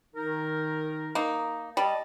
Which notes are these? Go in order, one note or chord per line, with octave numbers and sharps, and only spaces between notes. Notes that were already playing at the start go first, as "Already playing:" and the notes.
D#3 D#4 A#4
A#3 D#4
G3 D#5 A5